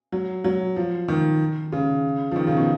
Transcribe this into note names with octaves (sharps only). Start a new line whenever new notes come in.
F#3
F#3
F3
D#3
C#3
F3
D#3
C#3
B2